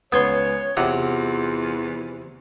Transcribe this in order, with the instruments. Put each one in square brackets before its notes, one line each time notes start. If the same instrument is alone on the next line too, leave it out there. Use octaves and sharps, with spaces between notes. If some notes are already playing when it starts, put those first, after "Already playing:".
[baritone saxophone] C#2 [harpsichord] B3 G#5 C6 [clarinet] C#5
[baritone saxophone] E2 [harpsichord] C3 F#5 A#5 [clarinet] F4